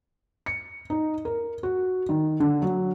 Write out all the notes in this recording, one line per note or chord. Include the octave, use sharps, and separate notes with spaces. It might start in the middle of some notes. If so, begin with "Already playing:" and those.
C#7
D#4
A#4
F#4
D#3
D3
F#3